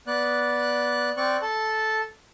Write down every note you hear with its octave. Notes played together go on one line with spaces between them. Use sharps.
B3 D5 F#6
C4 D5 C#6 F#6
A4 A5